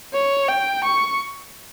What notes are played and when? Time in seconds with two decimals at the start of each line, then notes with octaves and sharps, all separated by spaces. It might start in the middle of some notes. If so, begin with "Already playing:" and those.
0.14 C#5
0.49 G5
0.84 C#6